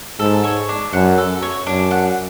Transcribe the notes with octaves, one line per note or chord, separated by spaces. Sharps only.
G#2 A4
C#5
D4
F#2 F#5
A4
C#5
F#2 D4
F#5